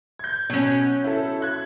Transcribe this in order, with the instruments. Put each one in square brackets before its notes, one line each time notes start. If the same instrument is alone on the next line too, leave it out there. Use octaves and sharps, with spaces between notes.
[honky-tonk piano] G6 G#6
[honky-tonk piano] B2 [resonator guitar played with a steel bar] F#3 C#4
[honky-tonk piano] E4 A4
E5 F#6 G#6